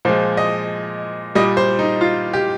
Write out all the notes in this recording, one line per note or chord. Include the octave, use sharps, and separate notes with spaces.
A#2 F3 G#3 C5
D#5
A#2 G3 D#5
C5
D#4
F4
G4